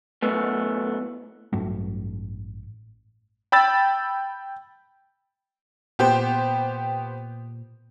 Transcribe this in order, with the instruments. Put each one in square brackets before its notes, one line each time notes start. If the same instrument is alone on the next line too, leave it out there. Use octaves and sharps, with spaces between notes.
[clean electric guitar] F#2 A2 A3 B3
[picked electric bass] A1 G2 F#3 A3
[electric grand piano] G5 B5 E6 A6
[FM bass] A#2 [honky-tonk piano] B3 G4 C5